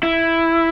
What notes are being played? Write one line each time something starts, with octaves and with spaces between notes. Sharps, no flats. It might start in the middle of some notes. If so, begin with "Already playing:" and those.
E4